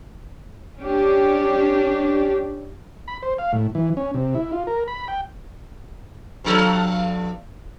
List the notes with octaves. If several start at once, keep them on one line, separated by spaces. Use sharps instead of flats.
C#4 D4 G4
B5
C5
F5
A2
E3
C#4
C3
E4
F4
A#4
B5
G5
G2 F3 A4